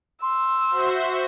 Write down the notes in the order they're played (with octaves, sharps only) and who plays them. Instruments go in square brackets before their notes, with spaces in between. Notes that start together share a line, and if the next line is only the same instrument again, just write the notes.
[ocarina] C6 [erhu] E6
[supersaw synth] F#4 C5 E5